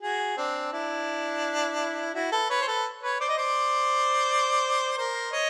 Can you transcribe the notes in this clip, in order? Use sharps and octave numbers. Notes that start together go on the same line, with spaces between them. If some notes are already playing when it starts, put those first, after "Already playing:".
F#4 G#4
C4 D4
D4 E4
E4 F#4
A4 B4
B4 C#5
C5
A4 B4
B4 C#5
C5 D5
D#5
C5 D5
A#4 C5
C#5 D#5